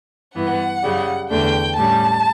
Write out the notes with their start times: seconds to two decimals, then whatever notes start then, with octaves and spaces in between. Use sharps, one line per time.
0.35 G2 E3 B3 F#5
0.83 F#2 C#3 G3
1.30 E2 D3 A3 D4 G5
1.77 A2 G3 C#4 A5